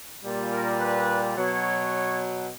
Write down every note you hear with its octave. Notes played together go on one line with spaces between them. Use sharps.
A#2 G3
A#4
B4
B2 F#3 C#5